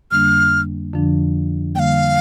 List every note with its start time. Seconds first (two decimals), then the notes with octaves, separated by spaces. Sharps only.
0.11 F2 D3 G3 A#3 D4 F6
0.93 F2 D3 F3 D4
1.75 D3 G3 A#3 F5 G5